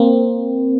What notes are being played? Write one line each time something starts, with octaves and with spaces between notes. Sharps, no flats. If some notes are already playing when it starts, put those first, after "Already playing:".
Already playing: A#3 C4